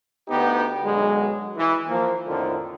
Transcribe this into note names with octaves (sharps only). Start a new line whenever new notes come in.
D2 B3 D#4 G4
B1 D3 F#3 G#3
E3
F3 A#3
F2 A2 D3 D#3 F3